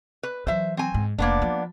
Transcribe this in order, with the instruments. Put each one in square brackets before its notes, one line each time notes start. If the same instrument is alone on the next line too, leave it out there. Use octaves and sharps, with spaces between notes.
[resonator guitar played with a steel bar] B4
[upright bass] E3 F#3 [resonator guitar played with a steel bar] C5 E5
[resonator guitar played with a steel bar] C4 G#5
[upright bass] G#2
[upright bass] F1 [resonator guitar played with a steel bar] A#3 B3 D4
[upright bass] F3